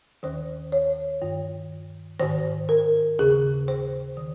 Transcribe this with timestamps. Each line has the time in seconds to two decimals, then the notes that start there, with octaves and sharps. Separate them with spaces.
0.23 D#2 D#3 C5
0.72 C#5
1.22 G2 D#3
2.20 G#2 D#3 C5
2.69 A#4
3.19 D#2 C#3 G#4
3.68 C5
4.17 D#3